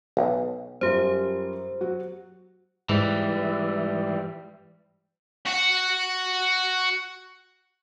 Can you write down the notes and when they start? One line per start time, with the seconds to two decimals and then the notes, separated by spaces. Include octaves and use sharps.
0.17 B1
0.81 F#2 G3 F4 G4 C5
1.81 F#3 F#4
2.89 G#2 E3 G3
5.46 F#4 F#5